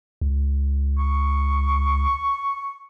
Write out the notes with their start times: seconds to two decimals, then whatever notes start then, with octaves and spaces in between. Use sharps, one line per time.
0.21 C#2
0.98 C#6